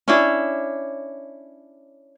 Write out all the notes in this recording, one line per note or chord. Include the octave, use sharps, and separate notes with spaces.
C#4 D4 E4